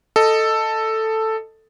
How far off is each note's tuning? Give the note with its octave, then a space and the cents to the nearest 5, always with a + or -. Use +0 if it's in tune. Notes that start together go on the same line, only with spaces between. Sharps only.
A4 +5 D#5 +0